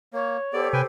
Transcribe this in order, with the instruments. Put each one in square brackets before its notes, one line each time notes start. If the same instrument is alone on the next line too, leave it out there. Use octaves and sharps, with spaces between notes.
[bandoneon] A#3 [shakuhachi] C#5
[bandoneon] B3 D5 [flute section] G4 A4 C5
[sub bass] C3 [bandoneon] B4 G5 G#5